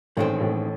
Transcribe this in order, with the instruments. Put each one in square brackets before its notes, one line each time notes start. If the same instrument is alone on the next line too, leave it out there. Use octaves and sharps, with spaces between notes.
[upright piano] A1 A2 [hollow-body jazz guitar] D#3 G#3 C4
[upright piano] A1 A2